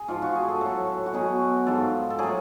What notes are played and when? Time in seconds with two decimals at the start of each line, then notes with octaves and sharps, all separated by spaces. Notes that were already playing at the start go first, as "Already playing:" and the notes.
Already playing: G#4
0.08 G#2 F3 F4
0.22 F#4
0.35 G#4
0.48 A4
0.61 A2 F#3 A4
1.06 F#4
1.14 B2 F#3 G#4
1.66 G#2 F3 A4
2.10 A4
2.19 A2 F#3 G#4